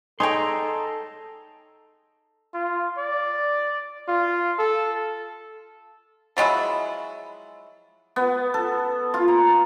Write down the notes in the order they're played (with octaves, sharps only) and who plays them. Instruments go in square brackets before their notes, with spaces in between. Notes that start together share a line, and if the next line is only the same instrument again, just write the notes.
[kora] D#4 [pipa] G#4 C#5 G5 [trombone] A4 [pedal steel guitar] A#5 C6
[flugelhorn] F4
D5
F4
A4
[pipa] F3 F#3 G#3 E4
[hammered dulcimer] B3
A4
F4
A#5